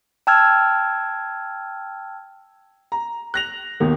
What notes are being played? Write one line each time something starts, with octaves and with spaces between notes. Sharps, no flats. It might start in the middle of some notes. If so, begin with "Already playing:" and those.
G5 A5 E6 F6 G#6
A#5
F#6 A#6 F7
D#2 B2 D#3 A#3